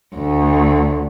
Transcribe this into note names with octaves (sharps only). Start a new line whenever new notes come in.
D2